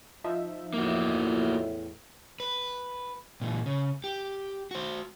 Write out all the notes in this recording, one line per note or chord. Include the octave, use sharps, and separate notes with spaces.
F3 D#4 E5
E2 A2 A#3 F#4
B4
A#2 E3
C#3
G4
F#4 C5